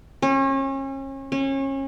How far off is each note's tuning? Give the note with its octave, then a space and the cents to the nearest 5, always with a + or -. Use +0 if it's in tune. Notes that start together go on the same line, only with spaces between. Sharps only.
C#4 -35
C#4 -30